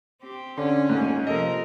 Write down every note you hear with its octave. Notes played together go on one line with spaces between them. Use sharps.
C4 G4
D3 C#4 C6
D#1 G#2 A3 A#3
C3 F3 A#3 A4 A#4 D#5